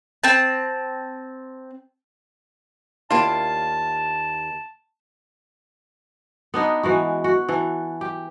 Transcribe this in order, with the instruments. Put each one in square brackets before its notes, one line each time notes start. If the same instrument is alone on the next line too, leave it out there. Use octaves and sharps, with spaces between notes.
[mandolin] C4 A5
[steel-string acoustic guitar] D#2 A#3 G4 [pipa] D4 E4 F4 [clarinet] A5
[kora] B3 D4 D#4
E3 G#3 F#4
F#4
E3 A4
G4